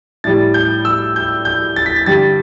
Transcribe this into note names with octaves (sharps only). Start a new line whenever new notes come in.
A2 G3 A6
G6
E6
G6
G6
A6
B6
A6
G2 D3 G3 A6